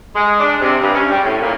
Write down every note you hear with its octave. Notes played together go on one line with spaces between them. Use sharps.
G#3
D4
C3
G2
C#4
G3
A2
A#2